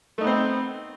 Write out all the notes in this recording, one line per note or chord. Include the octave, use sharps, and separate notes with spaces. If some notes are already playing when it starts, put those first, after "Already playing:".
A3 B3 C4 D#4